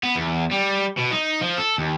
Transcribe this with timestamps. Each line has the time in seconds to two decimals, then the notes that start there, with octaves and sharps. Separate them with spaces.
0.03 B3
0.15 E2
0.51 G3
0.97 B2
1.11 D#4
1.41 F3
1.58 A4
1.78 D#2